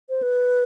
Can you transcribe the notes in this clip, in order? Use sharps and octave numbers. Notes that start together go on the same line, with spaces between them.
C5
B4